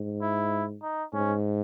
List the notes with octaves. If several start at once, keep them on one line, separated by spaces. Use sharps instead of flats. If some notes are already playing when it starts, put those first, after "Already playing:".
Already playing: G#2
E4
D#4
G#2 C#4